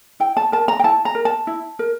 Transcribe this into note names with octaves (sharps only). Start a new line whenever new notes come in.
E4 G5
A5
A#4 A5
A#5
G5
E4 A5
A#5
A#4
A5
E4
A#4